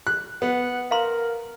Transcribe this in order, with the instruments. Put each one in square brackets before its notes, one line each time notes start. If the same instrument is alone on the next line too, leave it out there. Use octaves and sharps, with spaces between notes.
[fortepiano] F#6
[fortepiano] B3 [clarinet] F#5
[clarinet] A#4 [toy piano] F5 A#5 C6